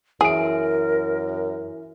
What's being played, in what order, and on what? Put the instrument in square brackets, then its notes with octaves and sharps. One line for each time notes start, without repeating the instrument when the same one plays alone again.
[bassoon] F#2 [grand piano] E3 E5 D7 [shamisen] G#4 [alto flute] A#4